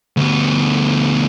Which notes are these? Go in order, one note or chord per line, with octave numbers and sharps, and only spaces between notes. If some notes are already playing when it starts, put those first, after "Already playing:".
D2 B3